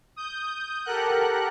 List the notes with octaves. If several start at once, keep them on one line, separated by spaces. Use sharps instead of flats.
D#6 G6
G4 A4 A#4 F#5 F#6